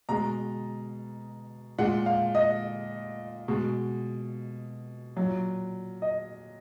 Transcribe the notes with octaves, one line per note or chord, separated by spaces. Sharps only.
B2 G#3 A#5
A#2 G#3 F#5
F5
D#5
B2 G#3
F#3
A#2
D#5